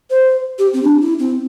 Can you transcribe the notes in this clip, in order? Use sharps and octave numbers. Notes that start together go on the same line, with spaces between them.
C5
G4
C4
D4
E4
C4